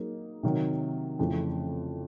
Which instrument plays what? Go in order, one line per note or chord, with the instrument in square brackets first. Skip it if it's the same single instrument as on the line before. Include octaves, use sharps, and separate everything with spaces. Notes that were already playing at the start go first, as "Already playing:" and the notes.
Already playing: [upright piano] F#3 A#3 D#4 G#4
C3 D#3 F#3
F2 C#3 E3 A3